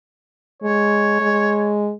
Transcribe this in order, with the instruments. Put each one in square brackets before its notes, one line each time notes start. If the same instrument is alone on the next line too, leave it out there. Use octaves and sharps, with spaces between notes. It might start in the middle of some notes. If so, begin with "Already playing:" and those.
[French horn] G#3 [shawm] C#5
[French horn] G#3